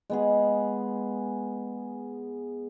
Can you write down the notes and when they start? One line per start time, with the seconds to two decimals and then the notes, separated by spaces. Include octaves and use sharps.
0.10 G#3 B3 G#4